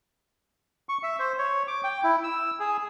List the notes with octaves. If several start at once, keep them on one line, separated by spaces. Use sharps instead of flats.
C#6
E5
C5
C#5
D6
G5
E4
E6
G#4